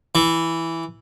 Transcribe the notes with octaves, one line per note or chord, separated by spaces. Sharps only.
E3